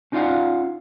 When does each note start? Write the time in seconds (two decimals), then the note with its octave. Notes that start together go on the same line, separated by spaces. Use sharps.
0.12 C#4 D#4 F4 D5 F5 F#5